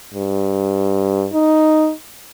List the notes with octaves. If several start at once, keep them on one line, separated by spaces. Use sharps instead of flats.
G2
D#4